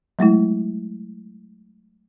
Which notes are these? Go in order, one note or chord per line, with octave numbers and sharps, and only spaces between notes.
F#3 G#3 A3 E4